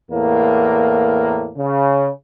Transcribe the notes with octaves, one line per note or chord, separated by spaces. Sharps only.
E2 A2 A#3
C#3